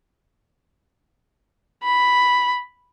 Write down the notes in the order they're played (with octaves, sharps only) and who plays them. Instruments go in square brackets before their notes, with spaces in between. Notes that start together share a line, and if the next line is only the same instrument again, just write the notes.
[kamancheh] B5